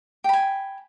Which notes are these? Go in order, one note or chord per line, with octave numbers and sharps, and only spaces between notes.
G5 G#5 B5